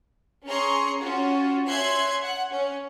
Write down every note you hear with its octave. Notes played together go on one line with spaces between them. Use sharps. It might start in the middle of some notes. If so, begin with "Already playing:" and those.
C#4 G#4 A#5 C6 C#6
C#4 F4 F#4
C#5 E5 G#5 C6 F#6 G#6
F#5
C#4